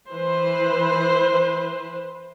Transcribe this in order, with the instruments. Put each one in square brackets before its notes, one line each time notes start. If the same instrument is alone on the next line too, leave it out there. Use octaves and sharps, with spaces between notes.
[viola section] E3 B4 C5